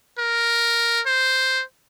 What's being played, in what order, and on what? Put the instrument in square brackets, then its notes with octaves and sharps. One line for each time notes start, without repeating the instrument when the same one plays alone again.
[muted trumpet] A#4
C5